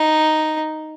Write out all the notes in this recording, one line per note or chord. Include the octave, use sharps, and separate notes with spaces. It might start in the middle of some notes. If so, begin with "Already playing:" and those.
Already playing: D#4